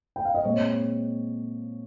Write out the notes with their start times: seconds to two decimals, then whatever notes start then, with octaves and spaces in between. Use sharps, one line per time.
0.16 G5
0.25 F5
0.34 D#5
0.45 A#2 G#3 C4 C#5